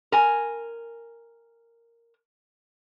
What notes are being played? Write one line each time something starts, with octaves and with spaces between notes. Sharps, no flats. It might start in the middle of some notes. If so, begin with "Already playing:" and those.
A#4 G#5